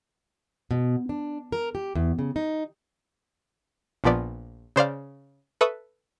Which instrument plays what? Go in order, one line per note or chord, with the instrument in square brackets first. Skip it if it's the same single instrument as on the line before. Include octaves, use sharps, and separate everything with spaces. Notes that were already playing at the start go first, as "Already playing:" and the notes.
[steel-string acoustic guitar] B2
D4
A#4
G4
E2
C#3
D#4
[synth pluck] A#1 A#2 F3 B3 D5
C#3 C5 D5 F5
A4 B4 E5 C#6 D#6